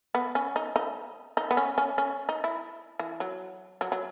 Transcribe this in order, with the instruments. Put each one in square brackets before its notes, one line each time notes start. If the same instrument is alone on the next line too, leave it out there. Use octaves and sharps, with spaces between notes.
[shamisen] B3
C#4
D#4
D#4
D#4
B3
C#4
C#4
C#4
D#4
E4
E3
F#3
F#3
F#3